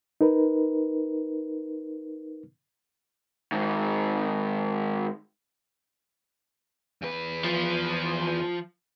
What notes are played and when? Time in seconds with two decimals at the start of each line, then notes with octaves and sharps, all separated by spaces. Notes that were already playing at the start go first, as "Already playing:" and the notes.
0.21 D#4 A#4 B4
3.52 G#2 D#3
7.02 E2 B4
7.44 F3